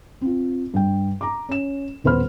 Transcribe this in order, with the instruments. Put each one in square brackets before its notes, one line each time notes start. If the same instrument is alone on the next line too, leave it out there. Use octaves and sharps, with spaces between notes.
[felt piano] C4 F4
G2 G5
A#5 D6
C#4 E7
D#1 B3 B4 C5 B5 F6